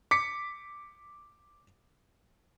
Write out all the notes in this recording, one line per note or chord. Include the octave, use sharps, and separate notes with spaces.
D6 B6 C#7